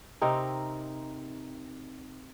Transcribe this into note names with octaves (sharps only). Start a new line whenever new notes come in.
C3 C4 D#4 A#4